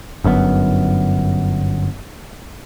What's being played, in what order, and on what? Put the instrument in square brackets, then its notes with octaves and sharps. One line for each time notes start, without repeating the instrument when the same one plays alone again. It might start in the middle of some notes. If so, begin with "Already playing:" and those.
[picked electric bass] G1 F#2 D3 B3